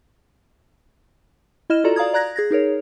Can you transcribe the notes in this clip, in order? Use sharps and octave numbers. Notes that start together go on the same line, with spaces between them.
E4 D#5 F6 E7
F4 F#4 A4 D5 A#5
D5 F5 A#5 D#6 G#6
D5 A#5 F#6 G#6 A#6
G#4 G#6 A#6
D#4 G#4 A#4 C#5